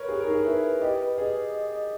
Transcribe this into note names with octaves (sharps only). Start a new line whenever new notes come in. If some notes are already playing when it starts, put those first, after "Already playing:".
Already playing: A#4 B4 C#5
G4 G#4
A#4
D#4 G#4
E4 B4
B4
G4 D#5
B4
G#4 D#5
D#5
D#5
D#5